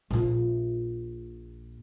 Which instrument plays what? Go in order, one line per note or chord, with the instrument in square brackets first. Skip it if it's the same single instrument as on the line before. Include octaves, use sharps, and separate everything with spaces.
[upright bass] A#1 F4